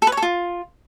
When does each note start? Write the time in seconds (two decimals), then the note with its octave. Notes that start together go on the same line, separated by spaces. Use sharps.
0.02 A4
0.07 B4
0.12 C#5
0.17 A4
0.22 F4